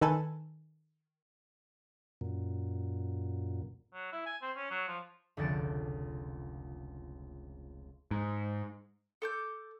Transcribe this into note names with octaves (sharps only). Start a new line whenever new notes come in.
D#3 D#4 A4 B4 G#5 A5
F#2 A#2
F#3
E4
G#5
C4
C#4
F#3
F3
F1 C#2 D3 A6 C#7 D7
G#2
A4 D6 G6